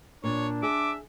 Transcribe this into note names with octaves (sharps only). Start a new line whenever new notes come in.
A#2 D4 C#5
G#4 E5 D6